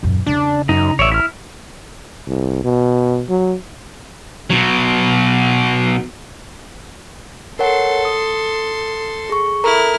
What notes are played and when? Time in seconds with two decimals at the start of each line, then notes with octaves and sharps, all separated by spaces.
0.03 D#1 F#2
0.27 E2 C#3 D4
0.69 F#2 D#4
0.99 A1 C#5 D5 E5
1.12 E4 F6
2.27 C2
2.64 B2
3.29 F#3
4.50 B2 F#3
7.59 A4 A#4 C#5 F#5 C6
8.05 D#6
9.30 G#4 C#6
9.64 E4 A4 A#4 A#5 F6